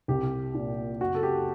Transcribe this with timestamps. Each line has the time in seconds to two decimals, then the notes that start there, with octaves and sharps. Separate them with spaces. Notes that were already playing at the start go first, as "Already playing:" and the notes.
0.08 C2 G4
0.54 A#2
1.01 F#1 F#4
1.15 A4
1.23 G4